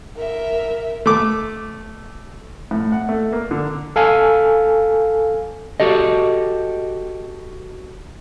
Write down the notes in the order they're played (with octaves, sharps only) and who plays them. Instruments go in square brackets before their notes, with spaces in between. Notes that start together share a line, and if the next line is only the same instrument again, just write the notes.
[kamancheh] A#4 E5
[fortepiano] A3 D6
A2
F#5
A3
A#3
D3
[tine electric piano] A4 F5 G#5
[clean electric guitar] F#4 G4 A4 D#5